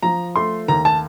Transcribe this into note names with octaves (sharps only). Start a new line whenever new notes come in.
F3 A#5
A3 C6
D#2 A#5
A5